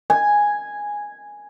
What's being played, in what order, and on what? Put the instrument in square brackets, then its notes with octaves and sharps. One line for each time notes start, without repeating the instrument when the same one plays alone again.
[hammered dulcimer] G#5